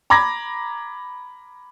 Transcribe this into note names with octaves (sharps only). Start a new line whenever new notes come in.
A#5 B5 D6 G#6 A#6